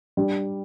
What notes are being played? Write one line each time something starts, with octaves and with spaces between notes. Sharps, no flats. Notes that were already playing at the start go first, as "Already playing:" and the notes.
G3 D4